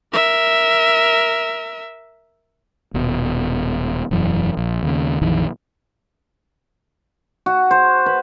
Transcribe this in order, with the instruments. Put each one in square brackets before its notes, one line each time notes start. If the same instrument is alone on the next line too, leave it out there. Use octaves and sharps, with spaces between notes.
[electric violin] A#4 E5
[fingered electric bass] D#1 B2
E1 F#2 E3
A#1
D#2 C#3
A#1 F2 D#3 E3
[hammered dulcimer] F#4
C5
B4